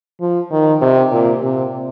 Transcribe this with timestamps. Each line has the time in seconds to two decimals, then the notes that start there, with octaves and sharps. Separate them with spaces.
0.21 F3
0.51 D#3
0.81 C3
1.12 A#2
1.42 C3